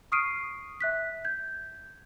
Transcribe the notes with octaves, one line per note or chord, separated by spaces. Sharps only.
C#6 D#6 F6 C7 D7 D#7
E5 F#6 B6
G6 G#6